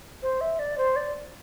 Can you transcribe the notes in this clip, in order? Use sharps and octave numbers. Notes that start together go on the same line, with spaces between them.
C5
E5
D5
C5
D5